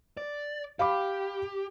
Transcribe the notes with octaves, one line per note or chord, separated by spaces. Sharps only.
D5
G4 F5 B5 D6